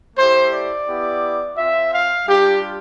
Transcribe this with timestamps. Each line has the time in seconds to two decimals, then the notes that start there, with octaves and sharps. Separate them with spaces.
0.16 A3 E4 G4 C5
0.52 D5
0.86 B3 E4 G4
1.56 C4 F4 E5
1.92 F5
2.26 G3 D4 F4 G4